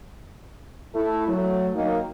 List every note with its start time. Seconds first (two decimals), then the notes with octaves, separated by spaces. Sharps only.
0.94 A3 E4
1.28 F#3 A3
1.74 D#3 F#3 A#3 D#4